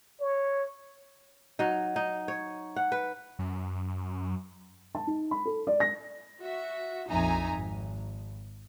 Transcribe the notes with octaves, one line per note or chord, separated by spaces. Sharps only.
C#5
F#3 D#4
D#4
C#5
F#5
B4
F#2
A5
D#4
B5
A4
D5
A#6
F#4 E5
A#1 F2 D#4 E5 G#5 A#5
G#1